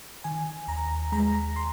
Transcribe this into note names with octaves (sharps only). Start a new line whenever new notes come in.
D#3 G#5
D#2 A#5
G#3 A#5
C6